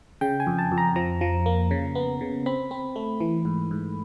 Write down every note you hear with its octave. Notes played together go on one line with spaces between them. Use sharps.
C#3 G5
G#5
F2
A5
F2
A#5
F3 A#5
F3
A#3
C#3
B3
C#3
C4 B5
C4
A3
E3
G#2
G#2